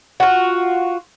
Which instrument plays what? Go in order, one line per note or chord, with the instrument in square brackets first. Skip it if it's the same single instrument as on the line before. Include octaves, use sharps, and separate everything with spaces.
[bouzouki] F4 F#4